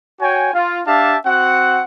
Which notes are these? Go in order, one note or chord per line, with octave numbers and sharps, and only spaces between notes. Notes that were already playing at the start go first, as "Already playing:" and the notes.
F#4 C#5 G5 G#5
F4
D4 G4 E5 F5 A5
C4 F#4 F#5